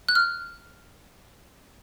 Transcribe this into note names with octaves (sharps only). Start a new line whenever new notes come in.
F#6
F6